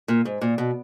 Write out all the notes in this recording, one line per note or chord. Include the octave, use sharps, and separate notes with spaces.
A#2
G#2
A#2
B2